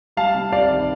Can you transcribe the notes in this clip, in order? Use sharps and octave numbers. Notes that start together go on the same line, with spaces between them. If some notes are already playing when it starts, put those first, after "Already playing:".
G3 F5 A5
C3
C2 D5 F5
D#3